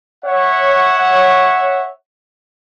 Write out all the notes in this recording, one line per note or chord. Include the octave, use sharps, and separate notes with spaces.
C#5 E5 F#5